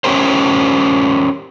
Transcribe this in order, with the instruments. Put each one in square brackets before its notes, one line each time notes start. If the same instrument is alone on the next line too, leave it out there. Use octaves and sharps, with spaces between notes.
[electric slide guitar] C#4 D#4 G4 A#4 C5